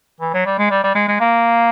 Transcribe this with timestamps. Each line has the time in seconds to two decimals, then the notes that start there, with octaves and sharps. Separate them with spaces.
0.21 E3
0.34 F#3
0.46 G3
0.59 G#3
0.70 G3
0.84 G3
0.95 G#3
1.08 G#3
1.20 A#3